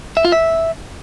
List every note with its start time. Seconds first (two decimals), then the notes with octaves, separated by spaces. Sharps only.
0.17 E5
0.25 F4
0.32 E5